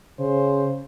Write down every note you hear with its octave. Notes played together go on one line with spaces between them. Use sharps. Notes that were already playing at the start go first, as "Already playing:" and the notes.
C#3 C5